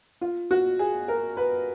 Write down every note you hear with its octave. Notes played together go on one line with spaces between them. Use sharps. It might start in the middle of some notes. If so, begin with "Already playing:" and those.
F4
F#4
G#4
A#4
B4